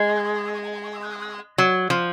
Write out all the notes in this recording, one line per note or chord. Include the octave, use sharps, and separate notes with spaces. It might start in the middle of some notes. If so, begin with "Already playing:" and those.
Already playing: G#3
F#3
F3